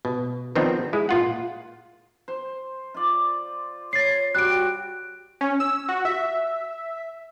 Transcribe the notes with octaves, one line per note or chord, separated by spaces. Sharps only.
B2
D#3 F3 B3 C4 D4 D#4
G#3 E4
A#2 F4 F#5
C5
F4 D5
C#5 A6 C7
G3 F#4 C#6 F#6 D7
C#4
E6
F#4
E5